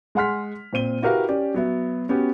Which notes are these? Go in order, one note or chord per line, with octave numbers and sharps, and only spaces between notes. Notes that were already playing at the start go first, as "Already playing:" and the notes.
G#3 G#4 F#5 C6 F6 B6
A#2 C4 C5 D#7 G7
E4 F#4 G4 A#4 B4 F5
C#4 G4 D5
F#3 B3 E5
B3 C#4 F#4 G4